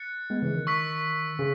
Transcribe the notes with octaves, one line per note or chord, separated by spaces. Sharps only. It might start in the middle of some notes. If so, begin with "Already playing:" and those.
Already playing: F#6 A6 C#7
G#3 B3
C#3 E3
D#3
C#6 E6 B6
C#3